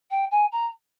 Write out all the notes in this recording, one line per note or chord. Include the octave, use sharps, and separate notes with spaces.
G5
G#5
A#5